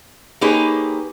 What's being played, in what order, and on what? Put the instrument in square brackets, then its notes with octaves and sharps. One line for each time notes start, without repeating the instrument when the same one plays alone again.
[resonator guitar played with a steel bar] A#3 D#4 G4 G#4 B4 C#5